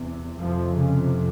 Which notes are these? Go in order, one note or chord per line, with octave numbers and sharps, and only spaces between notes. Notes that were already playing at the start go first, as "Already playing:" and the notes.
Already playing: E2 C3
F2 C3 F3
C#3